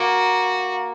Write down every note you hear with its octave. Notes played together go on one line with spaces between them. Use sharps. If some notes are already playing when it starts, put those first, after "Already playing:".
Already playing: A#3 F#4